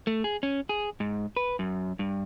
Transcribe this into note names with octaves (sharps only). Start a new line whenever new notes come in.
A3
G#4
C#4
G#4
G#2
B4
F#2
G2